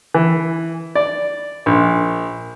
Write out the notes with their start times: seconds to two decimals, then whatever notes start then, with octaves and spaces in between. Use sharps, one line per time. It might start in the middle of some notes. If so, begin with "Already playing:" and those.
0.14 E3
0.95 D5
1.66 A#1